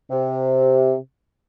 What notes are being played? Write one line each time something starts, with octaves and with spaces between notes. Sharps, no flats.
C3